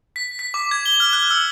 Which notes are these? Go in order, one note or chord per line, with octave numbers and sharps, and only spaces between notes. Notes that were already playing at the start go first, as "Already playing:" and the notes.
B6
B6
D6
G#6
G7
F6
F#6
E6